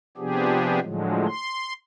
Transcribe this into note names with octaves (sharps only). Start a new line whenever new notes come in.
C3 F3 B3 D4 G4 G#4
A2 D3 F3 F#3 G#3
C6